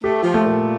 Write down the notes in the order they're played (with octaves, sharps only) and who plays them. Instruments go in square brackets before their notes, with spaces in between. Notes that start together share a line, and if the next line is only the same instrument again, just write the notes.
[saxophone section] A3 [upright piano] G4
[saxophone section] F3
[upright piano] A3
[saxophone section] A#2